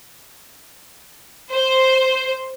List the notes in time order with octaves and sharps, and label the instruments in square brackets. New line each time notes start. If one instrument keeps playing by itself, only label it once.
[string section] C5